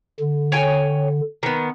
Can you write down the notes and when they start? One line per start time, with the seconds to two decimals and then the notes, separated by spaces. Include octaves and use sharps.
0.20 D3
0.52 C#5 G5 G#5
1.43 D#3 B3